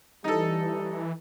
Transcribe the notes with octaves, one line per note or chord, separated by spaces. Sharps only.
E3 G3 D#4 A4